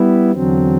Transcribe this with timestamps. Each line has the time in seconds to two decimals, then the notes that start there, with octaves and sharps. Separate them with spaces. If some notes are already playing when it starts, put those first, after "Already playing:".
Already playing: G3 B3 E4
0.31 E2 D3 F#3 C4